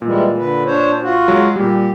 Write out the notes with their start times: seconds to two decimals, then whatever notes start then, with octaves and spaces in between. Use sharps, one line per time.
0.02 A#2 E3 G3 G#3
0.38 D3 B4
0.65 D4 C5 C#5
1.02 F4 F#4
1.28 F#3 G#3
1.56 A#2 G3 G4